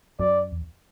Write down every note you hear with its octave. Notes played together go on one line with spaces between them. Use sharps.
F#2 D5
E2